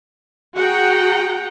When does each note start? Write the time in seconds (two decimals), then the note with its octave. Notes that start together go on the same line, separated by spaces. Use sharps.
0.56 F#4 G#4 F#5 G5 A#5